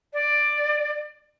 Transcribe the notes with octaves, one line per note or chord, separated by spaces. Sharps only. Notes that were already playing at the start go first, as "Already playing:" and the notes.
D5